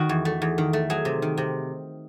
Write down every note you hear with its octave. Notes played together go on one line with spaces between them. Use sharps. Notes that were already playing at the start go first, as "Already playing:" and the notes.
Already playing: D#3 F#4
E2
A3
E2
D#3
A3
F#3 G#4
C3
D#3
C3